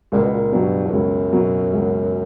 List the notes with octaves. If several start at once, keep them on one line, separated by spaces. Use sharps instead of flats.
C#2 A#2
B2
A#2
G2 B2 F#3
E2
C#2 F#2
B2 F#3
C#2